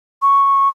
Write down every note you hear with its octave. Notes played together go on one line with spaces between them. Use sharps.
C#6